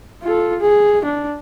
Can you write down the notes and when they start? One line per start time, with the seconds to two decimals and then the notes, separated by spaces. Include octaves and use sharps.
0.23 F4 A4
0.60 G#4
1.05 D4